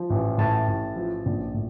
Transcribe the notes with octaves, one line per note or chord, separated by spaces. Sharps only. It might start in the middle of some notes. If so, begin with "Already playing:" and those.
Already playing: F3
A1
A2 A5
A1
F3
A#1
A2